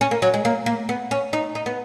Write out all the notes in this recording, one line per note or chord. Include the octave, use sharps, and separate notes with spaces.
C#4
A#3
F#3
G#3
A#3
A#3
B3
C#4
D#4
D#4
B3